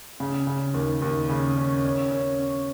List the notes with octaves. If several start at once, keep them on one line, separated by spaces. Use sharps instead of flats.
C#3
C#3
D#2
D#2
C#3
C#4
C#4
C#4
C#4